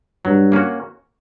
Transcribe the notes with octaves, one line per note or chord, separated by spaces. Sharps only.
G2 F#3
A#3 C#4 F#4